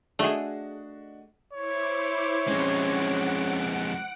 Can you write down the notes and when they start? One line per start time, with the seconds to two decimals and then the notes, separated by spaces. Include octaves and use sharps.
0.19 A3 D4 F#4 G#4 D#5
1.53 E4 C5 C#5 D6
2.48 F2 G#3 C#4 F#5 D7